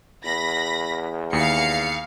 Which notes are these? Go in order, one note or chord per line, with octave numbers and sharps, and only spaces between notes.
E2 B5 A#6
D#2 F5 C7 C#7